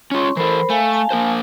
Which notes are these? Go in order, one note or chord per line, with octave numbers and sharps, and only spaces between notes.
C#4 F4 C#5 C6 C#6
E3 A4 A#4 C5 B5
A3 F5 G#5
F5 G#5 A5
A#3 A#4 C5